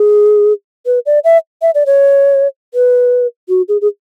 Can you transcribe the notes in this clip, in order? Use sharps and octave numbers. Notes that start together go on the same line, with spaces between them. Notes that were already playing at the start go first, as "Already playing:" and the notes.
Already playing: G#4
B4
D5
E5
E5
D5
C#5
B4
F#4
G#4
G#4